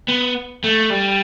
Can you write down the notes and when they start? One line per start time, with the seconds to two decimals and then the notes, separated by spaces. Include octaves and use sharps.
0.08 B3
0.64 A3
0.90 G3